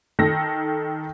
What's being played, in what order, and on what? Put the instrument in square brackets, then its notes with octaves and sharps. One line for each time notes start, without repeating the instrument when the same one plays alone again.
[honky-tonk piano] D#3 A4 A#6